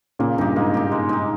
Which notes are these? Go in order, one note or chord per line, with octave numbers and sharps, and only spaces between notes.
A#2 C#3 A#3
G2 A#2 D#4 G4
G#2 A#3
D#4 G4
G#3
D#4 G4